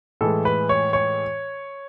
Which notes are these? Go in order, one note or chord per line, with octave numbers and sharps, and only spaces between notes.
A2 E3 G#3 A4
B4
C#5
C#5